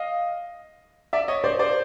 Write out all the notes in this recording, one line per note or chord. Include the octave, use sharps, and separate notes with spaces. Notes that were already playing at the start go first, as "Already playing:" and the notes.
Already playing: D#5 F5
D5 E5
C#5 D#5
C5 D5
C5 D5